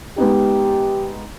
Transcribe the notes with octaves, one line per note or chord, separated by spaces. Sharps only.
G#3 B3 D#4 G4